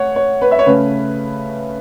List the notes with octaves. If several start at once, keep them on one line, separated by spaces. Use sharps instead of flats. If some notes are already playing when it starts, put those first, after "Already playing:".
Already playing: A3 C#5 F#5
C#5
B4
E5
C#5
C#3 A3 C#4 B4